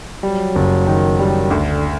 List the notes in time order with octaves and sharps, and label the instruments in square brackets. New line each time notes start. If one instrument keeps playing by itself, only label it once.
[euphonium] F#3 [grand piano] G3
[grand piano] F#1
D#3
G3
[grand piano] D2 [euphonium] D3